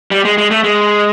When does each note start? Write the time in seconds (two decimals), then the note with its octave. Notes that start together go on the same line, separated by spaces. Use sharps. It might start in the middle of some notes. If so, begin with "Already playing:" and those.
0.11 G3
0.25 G#3
0.38 G#3
0.51 A3
0.64 G#3